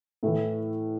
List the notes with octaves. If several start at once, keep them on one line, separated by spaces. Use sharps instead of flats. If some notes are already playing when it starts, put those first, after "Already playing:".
A2 E3 A3